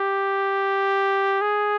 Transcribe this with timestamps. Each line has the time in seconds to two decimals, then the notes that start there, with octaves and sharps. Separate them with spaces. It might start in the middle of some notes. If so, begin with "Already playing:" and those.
Already playing: G4
1.41 G#4